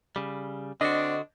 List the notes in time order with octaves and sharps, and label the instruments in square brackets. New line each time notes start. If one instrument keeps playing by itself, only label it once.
[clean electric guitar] C#3 G3
[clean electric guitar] D3 F#4 [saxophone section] C4 D4 [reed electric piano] D#5